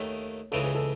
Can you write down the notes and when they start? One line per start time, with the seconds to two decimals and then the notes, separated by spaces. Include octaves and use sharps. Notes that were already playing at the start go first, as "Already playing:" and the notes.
Already playing: D#2 D#3 A3 C#5
0.52 C#2 C#3 E3 G#3 C4 A4
0.63 G#4
0.75 A4